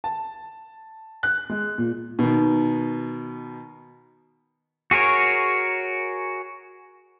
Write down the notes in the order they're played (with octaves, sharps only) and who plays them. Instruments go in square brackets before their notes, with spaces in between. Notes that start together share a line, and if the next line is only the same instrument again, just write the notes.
[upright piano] A5
F#6
G#3
A#2
[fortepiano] B2 D#3
[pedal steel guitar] F#4 G#4 A#4 C#5